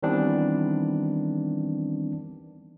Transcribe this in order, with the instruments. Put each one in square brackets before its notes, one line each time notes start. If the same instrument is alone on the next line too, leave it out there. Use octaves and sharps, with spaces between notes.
[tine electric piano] D#3 E3 G3 B3 C4 D4